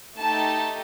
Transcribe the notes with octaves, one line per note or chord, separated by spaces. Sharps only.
A3 D#4 G4 A5